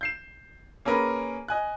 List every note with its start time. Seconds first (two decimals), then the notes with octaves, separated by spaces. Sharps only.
0.01 G6 C7 E7
0.85 A#3 C#4 G#4 A#4 B4
1.48 D#5 G#5 F#6